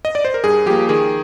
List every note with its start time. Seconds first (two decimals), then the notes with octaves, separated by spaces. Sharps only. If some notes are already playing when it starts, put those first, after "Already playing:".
0.05 D#5
0.15 D5
0.25 C5
0.34 A#4
0.44 G2 G#4
0.66 F3 A#3 G4
0.89 D#3 G#4